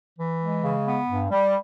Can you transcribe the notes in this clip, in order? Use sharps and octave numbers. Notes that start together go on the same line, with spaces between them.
E3
G#3
C#3
B3
G2
G3